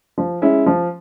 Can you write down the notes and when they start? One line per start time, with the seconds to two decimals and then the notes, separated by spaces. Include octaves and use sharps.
0.18 F3
0.42 G#3 C#4 E4
0.66 F3